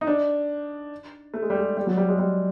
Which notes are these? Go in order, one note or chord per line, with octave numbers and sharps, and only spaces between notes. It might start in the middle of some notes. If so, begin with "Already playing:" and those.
D#4
D4
A3
G#3
G3
G#3
G3
F#3
G3
G#3
G3